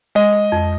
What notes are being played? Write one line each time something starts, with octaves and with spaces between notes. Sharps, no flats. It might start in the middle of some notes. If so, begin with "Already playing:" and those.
G#3 D#5
F2